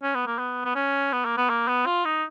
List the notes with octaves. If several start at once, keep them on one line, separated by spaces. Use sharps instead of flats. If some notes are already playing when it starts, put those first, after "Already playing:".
C#4
B3
A#3
B3
B3
C#4
B3
A#3
B3
A#3
B3
F4
D#4